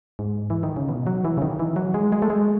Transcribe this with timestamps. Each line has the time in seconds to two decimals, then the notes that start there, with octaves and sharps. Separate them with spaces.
0.19 G#2
0.50 E3
0.63 D#3
0.76 C#3
0.89 B2
1.07 F#3
1.25 E3
1.37 C#3
1.42 D#3
1.59 E3
1.76 F#3
1.94 G#3
2.12 G#3
2.22 A3
2.30 G#3